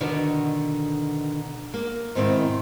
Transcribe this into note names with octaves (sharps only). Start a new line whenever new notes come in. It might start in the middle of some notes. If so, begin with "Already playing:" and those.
B2 D3 D#3 D4 F#4
A#3
G#2 B2 D#3 C4 E4